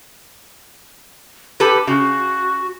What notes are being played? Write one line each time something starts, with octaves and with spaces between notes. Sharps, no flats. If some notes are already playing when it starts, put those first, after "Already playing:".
G4 A4 B4
C#3 F#4